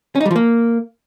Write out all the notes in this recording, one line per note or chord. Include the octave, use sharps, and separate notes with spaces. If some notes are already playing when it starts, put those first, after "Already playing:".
C#4
D#4
G3
F3
A#3